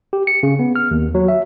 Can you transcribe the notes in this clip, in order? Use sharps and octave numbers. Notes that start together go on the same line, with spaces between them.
G4
C#7
C#3
B3
F6
D#2
F#3
E5